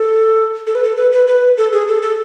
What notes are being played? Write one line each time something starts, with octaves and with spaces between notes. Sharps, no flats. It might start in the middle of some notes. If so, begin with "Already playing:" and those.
Already playing: A4
A4
B4
A4
B4
B4
B4
A4
G#4
A4
A4